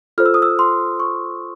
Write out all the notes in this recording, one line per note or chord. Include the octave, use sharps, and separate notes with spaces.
F4 A4 C5 F6
E6
D#6
E6
C6
C#6